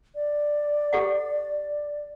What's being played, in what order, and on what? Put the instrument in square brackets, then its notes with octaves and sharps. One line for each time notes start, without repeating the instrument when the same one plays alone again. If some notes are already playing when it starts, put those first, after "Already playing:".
[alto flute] D5
[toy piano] G4 A4 F#5